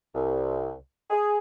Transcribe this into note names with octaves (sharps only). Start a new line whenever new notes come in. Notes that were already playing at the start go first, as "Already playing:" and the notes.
C2
G#4